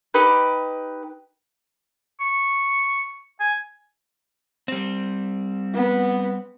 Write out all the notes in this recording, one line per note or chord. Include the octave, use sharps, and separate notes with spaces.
D#4 G4 B4
C#6
G#5
G3 C4
B3